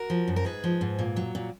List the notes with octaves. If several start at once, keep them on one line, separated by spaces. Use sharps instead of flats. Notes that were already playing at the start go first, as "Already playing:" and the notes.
Already playing: F#4 A#4
F3
F#2
A#4
G#2 G#4 B4
F3
G#2
A#2
F#3
A#2